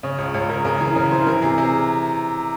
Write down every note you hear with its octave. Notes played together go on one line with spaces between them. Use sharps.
C#3 C#5
C#2 C#5
C#2 C#5
C#2 A#4
C#3 A#4
E3 G#4
C#3 A#4
E3 C5
E3 A#4
C3 G#4
C3 G#4